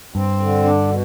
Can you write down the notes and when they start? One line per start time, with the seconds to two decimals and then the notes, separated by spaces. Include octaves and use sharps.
0.15 G2 C4
0.40 D3
0.64 D4
0.88 B2